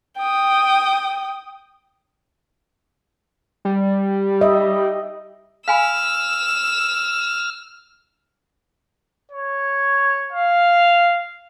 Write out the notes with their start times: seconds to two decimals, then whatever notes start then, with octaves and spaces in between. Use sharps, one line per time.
0.17 G5 D#6
3.65 G3
4.41 D#5 E5
5.68 F5 G#5 B5 E6 F6
9.32 C#5
10.33 F5